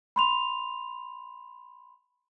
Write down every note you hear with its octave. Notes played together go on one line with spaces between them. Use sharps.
B5 C6 F7